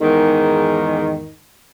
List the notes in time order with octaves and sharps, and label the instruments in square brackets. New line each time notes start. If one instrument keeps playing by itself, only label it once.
[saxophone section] E2 G#2 D#3